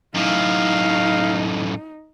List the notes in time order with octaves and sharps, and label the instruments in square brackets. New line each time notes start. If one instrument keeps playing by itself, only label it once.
[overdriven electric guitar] F#2 A2 [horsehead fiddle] D#4 [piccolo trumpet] F5